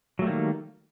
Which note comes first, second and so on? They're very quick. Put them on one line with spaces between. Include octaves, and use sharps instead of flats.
F#3 A3 G3 A#3 D#3